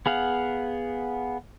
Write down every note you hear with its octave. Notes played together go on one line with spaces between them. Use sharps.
B3 G#4 F5 F#5